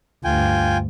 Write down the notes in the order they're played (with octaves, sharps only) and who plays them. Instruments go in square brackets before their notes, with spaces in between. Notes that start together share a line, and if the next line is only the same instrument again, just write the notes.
[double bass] D2 G2 [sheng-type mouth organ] F4 G5 G#5